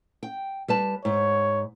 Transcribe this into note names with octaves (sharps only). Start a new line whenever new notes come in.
G5
G3 B4 A5
G#2 C#5